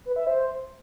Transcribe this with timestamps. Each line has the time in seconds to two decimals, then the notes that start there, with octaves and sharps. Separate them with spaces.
0.06 B4
0.16 E5
0.27 C5